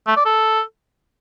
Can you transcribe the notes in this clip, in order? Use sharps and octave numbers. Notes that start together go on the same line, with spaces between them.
A3
D5
A4